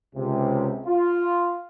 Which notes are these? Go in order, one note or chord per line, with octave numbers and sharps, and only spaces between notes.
C#2 C3
F4